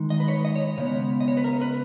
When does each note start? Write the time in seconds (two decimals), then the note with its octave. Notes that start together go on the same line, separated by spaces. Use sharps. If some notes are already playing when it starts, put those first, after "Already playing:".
Already playing: D#3 G#3 D#4
0.10 D#5
0.20 B4
0.28 C#5
0.45 D#5
0.56 C#5
0.78 C#3 G#3 B3 C#5
1.21 D#5
1.28 C#5
1.37 B4
1.44 A#4
1.62 B4